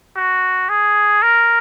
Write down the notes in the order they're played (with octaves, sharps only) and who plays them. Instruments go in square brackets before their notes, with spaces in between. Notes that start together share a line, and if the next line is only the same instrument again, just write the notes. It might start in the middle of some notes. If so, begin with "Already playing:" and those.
[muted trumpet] F#4
G#4
A#4